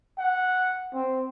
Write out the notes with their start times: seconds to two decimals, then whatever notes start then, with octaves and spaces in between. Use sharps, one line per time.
0.19 F#5
0.93 C4